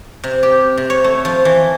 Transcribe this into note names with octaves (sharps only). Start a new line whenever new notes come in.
C3
G4
C3
C#5
A3
F3
E3